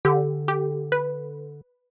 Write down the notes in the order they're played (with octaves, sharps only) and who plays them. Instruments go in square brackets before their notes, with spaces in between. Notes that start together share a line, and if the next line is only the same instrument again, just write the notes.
[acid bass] D3 [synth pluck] G4
[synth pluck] G4
B4